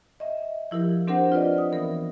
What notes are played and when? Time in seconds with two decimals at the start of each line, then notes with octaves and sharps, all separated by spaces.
0.20 D#5 E5
0.71 F3 E4 G4 A#4
1.08 C4 D4 G4 A#4 C5 F#5
1.32 F4 B4 D5 D#5
1.58 D#6
1.72 E3 B3 A#4